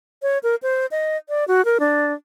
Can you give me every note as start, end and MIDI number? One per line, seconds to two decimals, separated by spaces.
0.22 0.38 73
0.43 0.55 70
0.63 0.86 72
0.91 1.17 75
1.29 1.44 74
1.48 1.64 66
1.65 1.78 70
1.80 2.13 62